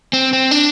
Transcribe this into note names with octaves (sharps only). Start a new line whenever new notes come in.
C4
C4
D4